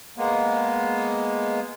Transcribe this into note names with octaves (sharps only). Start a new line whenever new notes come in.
G#3 A#3 B3